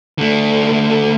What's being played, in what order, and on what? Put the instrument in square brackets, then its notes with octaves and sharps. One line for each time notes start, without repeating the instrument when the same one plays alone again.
[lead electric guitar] D3 A3